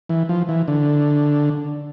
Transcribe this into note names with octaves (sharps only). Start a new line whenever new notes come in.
E3
F3
E3
D3